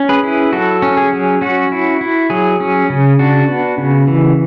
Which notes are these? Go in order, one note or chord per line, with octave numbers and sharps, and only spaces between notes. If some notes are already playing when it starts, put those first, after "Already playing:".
Already playing: C#4
G#4 B4
E4
F#3 F#4 A4
C#4
G#4
F#3
C#4 F#4
E4
E4
F#3 G#4
C#4
C#3
D4 F#4
B3
C#3
E3